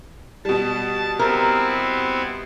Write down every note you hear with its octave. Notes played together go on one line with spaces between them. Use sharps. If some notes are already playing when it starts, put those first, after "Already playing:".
B2 G3 A5
B3 C4 E4 A#4